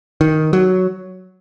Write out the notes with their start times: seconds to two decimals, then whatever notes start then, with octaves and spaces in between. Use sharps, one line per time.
0.21 D#3
0.53 F#3